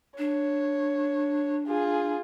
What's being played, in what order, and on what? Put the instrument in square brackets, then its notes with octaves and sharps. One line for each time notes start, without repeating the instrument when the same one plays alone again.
[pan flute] D4 [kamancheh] C#5
[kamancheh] F4 G#4